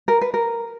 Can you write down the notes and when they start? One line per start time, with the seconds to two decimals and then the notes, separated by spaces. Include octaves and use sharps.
0.08 A#4
0.21 B4
0.34 A#4